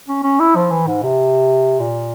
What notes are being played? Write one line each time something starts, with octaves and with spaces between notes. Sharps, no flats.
C#4
C#4
E4
F3
E3
G#2
C3
A#2